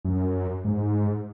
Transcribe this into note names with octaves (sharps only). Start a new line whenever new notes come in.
F#2
G#2